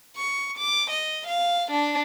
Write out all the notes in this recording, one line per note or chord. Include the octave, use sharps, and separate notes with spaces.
C#6
D6
D#5
F5
D4